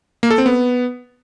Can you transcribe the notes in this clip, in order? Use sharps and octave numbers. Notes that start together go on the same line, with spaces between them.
A#3
A4
C4
B3